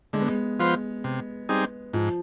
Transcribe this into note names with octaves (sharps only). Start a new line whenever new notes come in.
D3 G#3
B3
G#3
F3 B3 F4 C5
C3
G3 C4 D#4 G#4
G#2 F3